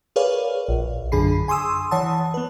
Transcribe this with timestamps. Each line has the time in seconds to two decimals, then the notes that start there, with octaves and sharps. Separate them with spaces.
0.16 G#4 A#4 B4 C#5 D5 F5
0.69 A#1
1.12 F#2 D3 G#4 B5 C7
1.48 G#5 C6 C#6 D#6 E6
1.91 E3 C#5 F#5 A5 D#6
2.34 B3 B4